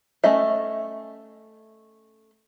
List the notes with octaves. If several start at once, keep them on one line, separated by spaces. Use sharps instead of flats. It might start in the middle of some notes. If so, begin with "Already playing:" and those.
A3 C#4 D#5 E5